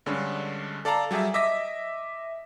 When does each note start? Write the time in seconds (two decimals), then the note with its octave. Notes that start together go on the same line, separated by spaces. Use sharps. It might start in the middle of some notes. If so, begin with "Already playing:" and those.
0.06 G2 D3 G#3 C#4 D4
0.85 A4 D5 F5 A5 A#5
1.11 F#3 G3 G4 G#4 E5
1.34 D#5 E5 D6 D#6 A#6 B6